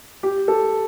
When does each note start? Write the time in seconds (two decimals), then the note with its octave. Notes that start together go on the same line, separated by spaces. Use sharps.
0.23 G4
0.48 A4